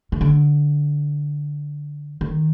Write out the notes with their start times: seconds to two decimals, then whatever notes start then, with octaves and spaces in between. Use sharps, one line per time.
0.12 D#3
0.21 D3
2.21 D#3